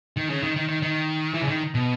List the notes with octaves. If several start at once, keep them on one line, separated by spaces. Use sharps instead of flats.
D#3
C#3
D#3
D#3
D#3
D#3
E3
C#3
D#3
B2